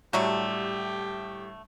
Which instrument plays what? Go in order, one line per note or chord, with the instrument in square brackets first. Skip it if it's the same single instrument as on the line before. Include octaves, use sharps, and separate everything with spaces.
[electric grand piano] A2 G3 [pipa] D3 F#3 A3 [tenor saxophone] G4